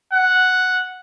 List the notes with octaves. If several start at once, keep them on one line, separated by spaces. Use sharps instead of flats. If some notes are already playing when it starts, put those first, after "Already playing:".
F#5